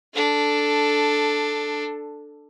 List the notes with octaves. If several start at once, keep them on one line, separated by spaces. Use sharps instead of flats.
D4 A4